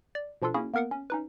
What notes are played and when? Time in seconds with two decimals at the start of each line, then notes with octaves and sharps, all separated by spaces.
0.15 D5
0.42 B2 F3 D4 F4 A4
0.54 A#3 C#4 E4 F#4 G#4
0.74 A#3 B3 A#4 F5 F#5
0.91 C#4
1.10 C#4 D#4 B4